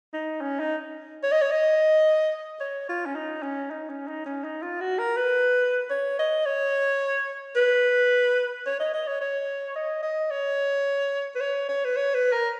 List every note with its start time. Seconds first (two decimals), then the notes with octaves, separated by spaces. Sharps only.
0.14 D#4
0.41 C#4
0.60 D#4
1.23 C#5
1.32 D#5
1.42 C#5
1.51 D#5
2.60 C#5
2.89 F4
3.06 C#4
3.16 D#4
3.43 C#4
3.71 D#4
3.89 C#4
4.08 D#4
4.26 C#4
4.44 D#4
4.62 F4
4.81 F#4
4.99 A#4
5.17 B4
5.90 C#5
6.19 D#5
6.46 C#5
7.56 B4
8.66 C#5
8.80 D#5
8.94 D#5
9.07 C#5
9.21 C#5
9.76 D#5
10.03 D#5
10.31 C#5
11.36 B4
11.41 C#5
11.69 C#5
11.85 B4
11.96 C#5
12.14 B4
12.33 A#4